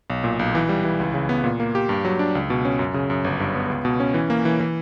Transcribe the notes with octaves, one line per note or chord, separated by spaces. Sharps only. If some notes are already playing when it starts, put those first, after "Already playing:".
B1
A#2
B1
E3
G3
E3
C#2
C#3
B3
A#2
A#3
G4
G2
F#3
D4
C#2
B2
C#4
F#2
C#3
F#2
G1
G2
B3
C#2
B2
C#4
E3
A#3
E3
E3